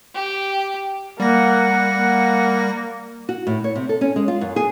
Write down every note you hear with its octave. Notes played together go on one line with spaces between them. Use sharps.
G4
G3 A#3 F#5 A#6
A#3
F#4
A2
C#5
C3
A4
C#4
G#3
F4
F#2
G#4